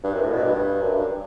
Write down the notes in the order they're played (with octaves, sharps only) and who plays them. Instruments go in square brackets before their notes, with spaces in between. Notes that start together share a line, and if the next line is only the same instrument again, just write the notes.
[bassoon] G2
F#2
A2
B2
G2
F#2
G2